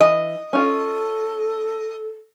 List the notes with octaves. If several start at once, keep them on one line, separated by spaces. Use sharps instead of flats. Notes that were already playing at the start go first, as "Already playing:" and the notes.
E3 D#5
C#4 F4 A4